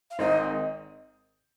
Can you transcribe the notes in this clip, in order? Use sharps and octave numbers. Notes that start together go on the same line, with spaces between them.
F5
G#1 G#2 D#3 C4 D#4 D#5